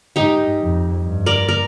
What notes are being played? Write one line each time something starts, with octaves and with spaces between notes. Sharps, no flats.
G#2 D#4 G4
F2
G2
A#4 D5
A#4 D5